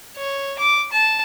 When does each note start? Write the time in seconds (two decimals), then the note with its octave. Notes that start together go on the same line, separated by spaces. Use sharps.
0.16 C#5
0.59 D6
0.92 A5